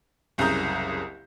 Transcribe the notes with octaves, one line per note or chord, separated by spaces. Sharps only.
F#1 C2 C#3 A#5 D#6 G6